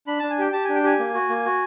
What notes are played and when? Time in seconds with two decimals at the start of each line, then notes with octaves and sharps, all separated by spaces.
0.07 D4 B5
0.19 D4 A5
0.30 G#5
0.38 G4 G5
0.53 G4 A5
0.65 D4 G#5
0.75 G5
0.84 G4 G#5
0.99 A#3
1.14 F#4
1.29 A#3
1.45 F#4